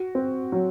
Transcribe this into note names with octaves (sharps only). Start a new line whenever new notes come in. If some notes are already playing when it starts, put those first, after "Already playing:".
Already playing: F#4
C4
F#3